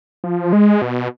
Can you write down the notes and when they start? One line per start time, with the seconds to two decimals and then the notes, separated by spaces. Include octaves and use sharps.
0.24 F3
0.53 G#3
0.82 B2